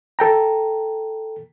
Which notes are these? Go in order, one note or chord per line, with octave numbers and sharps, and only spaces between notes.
A4 G5 A#5